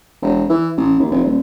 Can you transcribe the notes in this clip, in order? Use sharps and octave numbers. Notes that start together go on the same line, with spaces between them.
E1
E3
A1
D#2
F1
D#1